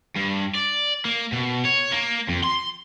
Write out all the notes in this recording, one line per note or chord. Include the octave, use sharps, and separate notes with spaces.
G2
D5
A#3
B2
C#5
A#3
F2
C6